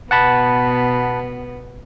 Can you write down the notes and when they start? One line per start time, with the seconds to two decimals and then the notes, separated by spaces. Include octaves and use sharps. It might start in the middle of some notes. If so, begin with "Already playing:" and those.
0.11 B2 B3 F#5 A5 B5